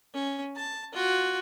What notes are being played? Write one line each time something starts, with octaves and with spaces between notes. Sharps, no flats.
C#4
A5
F4 F#4